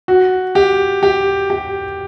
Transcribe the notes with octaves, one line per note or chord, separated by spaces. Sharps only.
F#4
G4
G4
G4